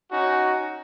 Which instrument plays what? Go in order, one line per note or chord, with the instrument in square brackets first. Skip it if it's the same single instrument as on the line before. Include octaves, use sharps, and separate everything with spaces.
[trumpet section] C#4 D#4 F#4